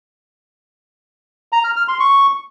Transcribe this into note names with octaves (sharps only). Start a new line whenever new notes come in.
A#5
F6
F6
C6
C#6